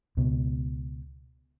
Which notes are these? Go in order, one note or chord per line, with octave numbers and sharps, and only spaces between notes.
C#2 B2